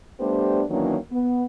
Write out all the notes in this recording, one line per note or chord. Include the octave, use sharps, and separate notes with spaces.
G3 A3 B3 D4 G4 C5
D#3 E3 F#3 A#3 C#4 D4
B3